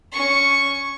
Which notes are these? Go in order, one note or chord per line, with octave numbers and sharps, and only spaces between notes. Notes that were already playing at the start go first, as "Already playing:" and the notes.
C#4 C#6